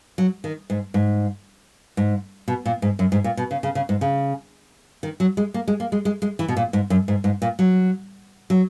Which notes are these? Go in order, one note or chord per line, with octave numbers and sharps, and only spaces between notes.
F#3
D#3
G#2
G#2
G#2
B2
A#2
G#2
F#2
G#2
A#2
B2
C#3
C#3
C#3
G#2
C#3
D#3
F#3
G#3
A#3
G#3
A#3
G#3
G#3
G#3
E3
B2
A#2
G#2
F#2
G#2
G#2
A#2
F#3
F#3